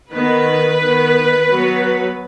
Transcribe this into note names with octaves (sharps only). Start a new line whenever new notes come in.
D#3 B3 B4
D#3 B3
F#3 B3